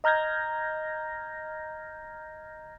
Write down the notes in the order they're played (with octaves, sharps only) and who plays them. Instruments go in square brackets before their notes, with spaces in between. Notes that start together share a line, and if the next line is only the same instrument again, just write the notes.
[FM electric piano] D#5 A#5 F6 G6 G#6 A#6